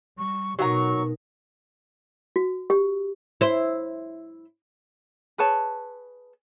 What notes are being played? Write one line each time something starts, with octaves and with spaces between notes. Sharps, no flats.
G3 C#6
B2 F#3 D#4 A#4 F#5 A#5 C#6
F#4
G4
E4 C5
G#4 B4 C#5 A5